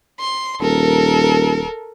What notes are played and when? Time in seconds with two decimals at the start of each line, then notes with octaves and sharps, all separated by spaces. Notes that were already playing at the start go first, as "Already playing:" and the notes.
0.20 C6
0.61 D#1 A4 A#4